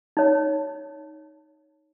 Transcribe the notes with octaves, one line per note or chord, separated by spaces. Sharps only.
D#4 C#5